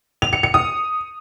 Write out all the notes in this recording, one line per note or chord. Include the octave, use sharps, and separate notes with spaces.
F7
C#7
C#7
D#6